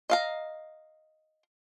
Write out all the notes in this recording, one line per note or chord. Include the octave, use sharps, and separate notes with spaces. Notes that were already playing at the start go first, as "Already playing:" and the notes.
D#5 F5 A#5